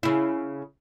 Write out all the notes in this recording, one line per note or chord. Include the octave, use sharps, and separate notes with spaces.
C#3 E4